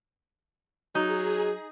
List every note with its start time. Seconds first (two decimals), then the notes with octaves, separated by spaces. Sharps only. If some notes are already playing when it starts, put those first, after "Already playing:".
0.95 F#3 D#4 G#4